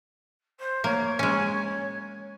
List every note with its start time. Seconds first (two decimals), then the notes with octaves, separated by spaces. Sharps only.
0.59 C5
0.84 A#3 C#5
1.19 G#3 C#4